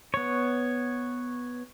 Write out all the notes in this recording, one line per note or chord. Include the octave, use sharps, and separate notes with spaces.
B3 C#5